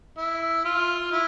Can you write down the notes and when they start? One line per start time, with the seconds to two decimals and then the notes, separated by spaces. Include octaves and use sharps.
0.17 E4
0.65 F4
1.12 E4